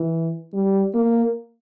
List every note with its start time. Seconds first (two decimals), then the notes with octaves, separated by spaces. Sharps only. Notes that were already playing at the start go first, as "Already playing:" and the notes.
Already playing: E3
0.54 G3
0.94 A#3